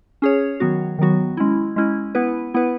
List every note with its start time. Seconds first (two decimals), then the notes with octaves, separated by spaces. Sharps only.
0.22 C#4 G#4 C#5
0.60 D#3 F#3 B3 F#4
0.99 D#3 F#3 B3 F#4
1.37 G#3 C#4 E4
1.76 G#3 C#4 E4
2.15 B3 E4 B4
2.54 B3 E4 B4